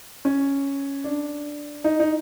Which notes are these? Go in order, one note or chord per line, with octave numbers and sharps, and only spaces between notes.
C#4
D4
D#4
D#4